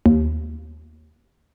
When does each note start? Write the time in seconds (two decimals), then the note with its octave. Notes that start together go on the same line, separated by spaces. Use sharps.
0.06 D#2